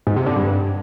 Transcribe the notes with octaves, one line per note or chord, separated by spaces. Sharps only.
G#2
C3
D3
G2